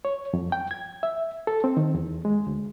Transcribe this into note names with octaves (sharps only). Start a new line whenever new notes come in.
C#5
F2
G5
G#6
E5
A4
C4
D#3
E2
G#3
D2